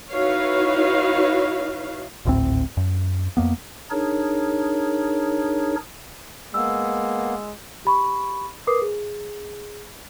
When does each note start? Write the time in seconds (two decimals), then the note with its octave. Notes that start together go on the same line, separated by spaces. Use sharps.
0.12 D#4 E4 F#4 B4 C#5 F5
2.25 G#1 D2 A2 C4
2.77 F#2
3.37 F2 A#3 B3
3.90 D4 D#4 G#4 A#4 C#5
6.54 G#3 A#3 B3 E6
7.85 G4 B5 C#6
8.67 A#4 B4 D6 D#6 C7
8.82 G#4